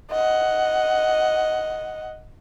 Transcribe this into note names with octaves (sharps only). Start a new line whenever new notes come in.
D#5 F#5